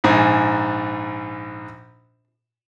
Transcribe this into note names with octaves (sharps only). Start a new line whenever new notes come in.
A#1 G#2 G#5